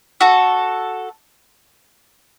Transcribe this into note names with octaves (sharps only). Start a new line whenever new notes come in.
F#4 A4